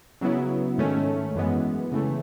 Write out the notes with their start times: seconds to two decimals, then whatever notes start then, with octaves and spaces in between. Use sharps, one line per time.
0.21 C#3 F#3 B3 E4
0.78 G#2 D#3 A3 C#4
1.35 F#2 E3 G#3 B3
1.92 C#3 E3 A3